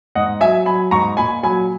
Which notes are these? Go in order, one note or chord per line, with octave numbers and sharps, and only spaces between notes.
G#2 D#5 F#5
F#3 E5 G#5
F#3 G#5 B5
G#2 A#5 C#6
A#2 G#5 B5
F#3 G#5 B5